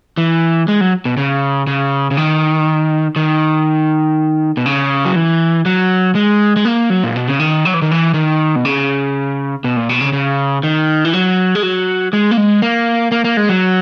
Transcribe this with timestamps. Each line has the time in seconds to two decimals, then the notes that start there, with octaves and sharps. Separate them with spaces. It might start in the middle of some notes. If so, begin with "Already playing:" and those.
0.17 E3
0.68 G#3
0.81 F#3
1.05 B2
1.17 C#3
1.67 C#3
2.11 C#3
2.17 D#3
3.16 D#3
4.57 B2
4.66 C#3
5.05 F#3
5.16 E3
5.66 F#3
6.15 G#3
6.56 G#3
6.65 A#3
6.90 F#3
7.04 A#2
7.16 B2
7.28 C#3
7.40 D#3
7.65 F#3
7.74 E3
7.82 D#3
7.91 E3
8.14 D#3
8.56 B2
8.65 C#3
9.64 B2
9.76 A#2
9.89 B2
10.01 C#3
10.13 C#3
10.63 D#3
11.05 E3
11.14 F#3
11.55 G#3
11.63 F#3
12.13 G#3
12.31 A#3
12.37 G#3
12.62 A#3
13.12 A#3
13.24 A#3
13.37 G#3
13.49 F#3